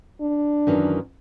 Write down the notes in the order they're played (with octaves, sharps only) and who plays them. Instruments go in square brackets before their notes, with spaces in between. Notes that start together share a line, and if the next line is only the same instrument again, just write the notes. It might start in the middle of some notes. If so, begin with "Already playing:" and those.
[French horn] D4
[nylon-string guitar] F#2 D#3 E3